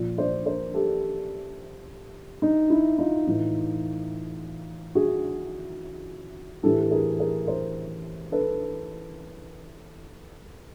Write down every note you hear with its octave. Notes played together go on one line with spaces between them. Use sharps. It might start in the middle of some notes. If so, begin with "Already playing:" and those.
Already playing: A#2 F3
C5 D5
A#4 C5
G4 A4
D#4
E4
D#4 F4
A2 E3
F#4 G#4
A2 E3 G4 A4
A4
G#4 A#4
G#4 A#4
A#4 C5
A4 B4